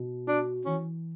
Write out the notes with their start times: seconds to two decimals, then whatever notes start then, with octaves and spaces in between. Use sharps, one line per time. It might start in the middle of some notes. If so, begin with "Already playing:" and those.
Already playing: B2
0.27 D4 F#4
0.66 E3 C#4